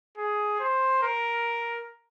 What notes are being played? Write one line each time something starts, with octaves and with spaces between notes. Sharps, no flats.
G#4
C5
A#4